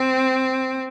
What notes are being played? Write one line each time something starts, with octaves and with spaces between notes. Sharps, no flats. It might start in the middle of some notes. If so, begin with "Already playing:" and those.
Already playing: C4